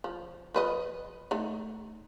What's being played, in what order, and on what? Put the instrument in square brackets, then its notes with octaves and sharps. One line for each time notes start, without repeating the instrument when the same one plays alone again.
[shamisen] F3
F3 B4 D#5
A3 D#4